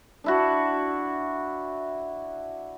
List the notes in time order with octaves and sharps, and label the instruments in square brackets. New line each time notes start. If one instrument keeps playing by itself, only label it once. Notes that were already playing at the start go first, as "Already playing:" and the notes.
[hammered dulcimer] D4 E4 F#4